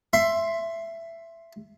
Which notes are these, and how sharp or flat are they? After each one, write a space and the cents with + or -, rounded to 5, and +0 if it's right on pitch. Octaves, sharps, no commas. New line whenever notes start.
E5 +15 C6 +5